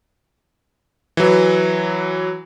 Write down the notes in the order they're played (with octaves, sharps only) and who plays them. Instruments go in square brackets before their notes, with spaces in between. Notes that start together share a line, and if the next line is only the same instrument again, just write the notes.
[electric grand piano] E3 F#3